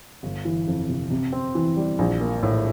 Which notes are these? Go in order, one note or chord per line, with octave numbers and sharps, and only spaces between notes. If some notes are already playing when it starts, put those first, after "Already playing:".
G1
E3
F2
C3
C3
C4
E3
G3
A#1
A#3
A2